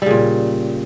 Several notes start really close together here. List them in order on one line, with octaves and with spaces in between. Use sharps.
G3 C#3 A#2